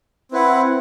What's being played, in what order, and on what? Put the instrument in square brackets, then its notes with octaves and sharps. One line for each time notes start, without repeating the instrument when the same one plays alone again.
[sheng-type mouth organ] C4 E4 B4 F#5